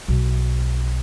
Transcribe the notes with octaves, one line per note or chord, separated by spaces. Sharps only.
B1